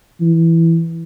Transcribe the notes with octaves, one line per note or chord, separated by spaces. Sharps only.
E3